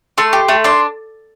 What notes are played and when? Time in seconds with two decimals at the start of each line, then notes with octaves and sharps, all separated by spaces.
0.18 A3 C6
0.33 G4
0.49 A3
0.64 D4 C6